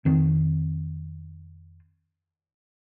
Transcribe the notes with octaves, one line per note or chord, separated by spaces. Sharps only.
F2 D#3 C4